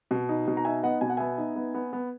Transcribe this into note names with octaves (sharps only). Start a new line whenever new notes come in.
B2
D#4
B2
A#5
D#4 E5 G#5
B3 D#5 F#5
B2 G#5
F#5
B3 E5 G#5
D#4
B3
B3
B3